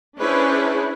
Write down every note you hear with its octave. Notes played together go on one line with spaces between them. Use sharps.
C#4 D4 E4 G#4 B4 C5